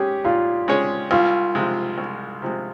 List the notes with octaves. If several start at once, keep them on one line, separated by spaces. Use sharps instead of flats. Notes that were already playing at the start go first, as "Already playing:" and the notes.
Already playing: G#3 C#4 G4 G#4 C#5
A#2 F4
G#3 C#4 G#4 C#5
C2 F4
C3 F3 G#3
C2
C3 F3 G#3